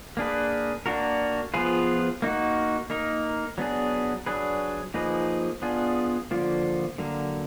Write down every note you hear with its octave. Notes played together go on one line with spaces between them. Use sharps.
A#3 D4 G#4 B4
A#3 D4 F#4 A#4
F3 B3 F4 G#4 B4
A#3 D#4 F#4
A#3 D#4 A#4
F#3 B3 D4 G#4
F#3 D4 G#4 B4
F3 A#3 D#4 G#4 B4
B3 D4 F4 G#4
D3 F3 A#3 F4
D3 F#3 A#3